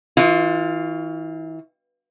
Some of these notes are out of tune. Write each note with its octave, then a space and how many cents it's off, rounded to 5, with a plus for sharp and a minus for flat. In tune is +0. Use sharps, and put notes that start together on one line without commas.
E3 -40 F4 +0